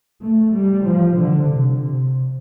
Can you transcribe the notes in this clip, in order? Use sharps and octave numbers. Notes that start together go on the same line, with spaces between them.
A3
G3
F3
D3
C3
C3